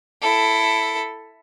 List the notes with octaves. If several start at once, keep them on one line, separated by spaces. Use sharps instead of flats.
E4 A4